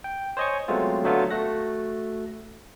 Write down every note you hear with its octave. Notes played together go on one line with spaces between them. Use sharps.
G5
C5 C#5 D#5 G#5 C#6
F#3 G#3 A3 B3 C4 F4
D3 F#3 A3 B3 F4
A3 F#4 F#6 A#6